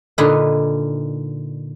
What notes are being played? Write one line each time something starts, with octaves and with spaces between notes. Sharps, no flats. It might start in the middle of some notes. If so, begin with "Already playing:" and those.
A#2 D3 D#4 A#4 B4 G#5